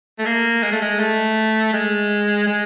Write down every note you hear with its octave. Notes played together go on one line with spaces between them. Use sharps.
A3
A#3
G#3
A3
G#3
A3
G#3
G#3